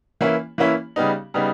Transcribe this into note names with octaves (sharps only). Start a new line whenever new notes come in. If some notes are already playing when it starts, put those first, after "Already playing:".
E3 A#3 C#4 E4
E3 A#3 C#4 E4
C#3 G3 B3 D#4
C#3 G3 B3 D#4